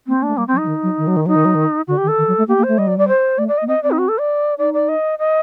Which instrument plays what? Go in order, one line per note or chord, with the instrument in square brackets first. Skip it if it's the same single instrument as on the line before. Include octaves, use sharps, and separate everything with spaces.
[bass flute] A#3 [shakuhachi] C4
[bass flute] A#3 [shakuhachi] D4
[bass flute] A3
[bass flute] G3 [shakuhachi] A#3
[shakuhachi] C4
[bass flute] F#3
[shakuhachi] D#4
[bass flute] F#3
D#3
F#3
D#3
F#3
D#3
[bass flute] F#3 [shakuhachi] D#4
[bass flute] D#3
F#3
D#3
[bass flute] D3 [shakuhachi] F#4
[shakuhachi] G4
[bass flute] D#3
[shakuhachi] A4
[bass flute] D#3
F#3
A3
[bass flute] A#3 [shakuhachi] G4
[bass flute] A#3
[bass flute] A3 [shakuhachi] C5
[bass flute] G3 [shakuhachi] D#5
[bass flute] F#3 [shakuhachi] D5
[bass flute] G3 [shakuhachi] D5
[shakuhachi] C5
[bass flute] A3 [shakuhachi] D5
[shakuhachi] D5
D#5
[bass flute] A#3
[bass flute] C4 [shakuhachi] D#5
[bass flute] C4 [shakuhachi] D5
[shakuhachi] D#4
F#4
A4
D5
[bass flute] D#4 [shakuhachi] D5
[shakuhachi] D5
D#5
D#5